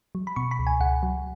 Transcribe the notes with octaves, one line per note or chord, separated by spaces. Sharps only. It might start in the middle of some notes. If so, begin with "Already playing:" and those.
F#3
B5
B2 C#6
B5
C#2
G#5
C#2 F#5
F#3